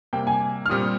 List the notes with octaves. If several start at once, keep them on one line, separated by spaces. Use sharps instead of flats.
C3 G3 A#3 G5
G#5
F6
A#2 G3 C4 G4 D#6